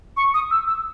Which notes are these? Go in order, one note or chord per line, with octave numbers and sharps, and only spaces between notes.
C#6
D#6
E6
E6